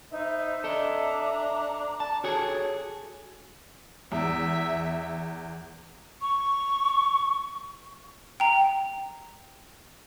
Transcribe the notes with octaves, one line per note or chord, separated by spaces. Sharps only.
D#4 B4 C5 E5
D4 A4 D#5 A#5 D6
A5
F#4 G#4 A4 C#5
E2 E5
C#6
G5 A#5